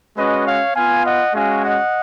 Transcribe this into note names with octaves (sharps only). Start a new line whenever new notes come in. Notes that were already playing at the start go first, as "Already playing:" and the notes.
G#3 C#4 F#4 B4 D#5
C#5 F5
B3 F4 F5 G#5
D#5 F#5
G#3 C#4 F#4 F5 G#5
D#5 F#5